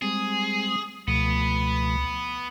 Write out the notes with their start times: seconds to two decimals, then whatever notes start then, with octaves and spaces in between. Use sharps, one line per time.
0.02 G3 G#3 C4 G#4
1.08 C#2 B2 F3 A3 B3